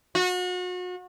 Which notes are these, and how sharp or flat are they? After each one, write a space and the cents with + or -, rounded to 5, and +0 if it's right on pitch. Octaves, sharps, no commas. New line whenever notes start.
F#4 -35